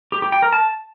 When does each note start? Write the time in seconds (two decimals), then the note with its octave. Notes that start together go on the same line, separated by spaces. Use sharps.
0.12 G4
0.22 G4
0.32 G5
0.42 A#4
0.53 A5